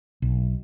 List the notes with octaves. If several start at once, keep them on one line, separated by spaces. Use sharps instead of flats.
B1